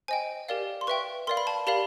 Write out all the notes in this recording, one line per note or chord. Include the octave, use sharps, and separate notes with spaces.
C5 D#5 G5 G#5
G4 A#4 D5 F5
C6
B4 E5 G5 C#6
A#4 D5 F5 C6
B5
A5
G4 A#4 D5 F5 B5